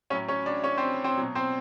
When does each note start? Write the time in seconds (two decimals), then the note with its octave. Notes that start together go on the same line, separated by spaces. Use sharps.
0.10 A2 F#3 C#4 C#5
0.28 C#4 C#5
0.46 D4 D5
0.64 C#4 C#5
0.78 C4 C5
1.04 C4 C5
1.17 B2 F#3
1.35 C4 C5